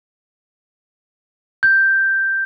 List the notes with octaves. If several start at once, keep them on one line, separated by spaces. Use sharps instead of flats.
G6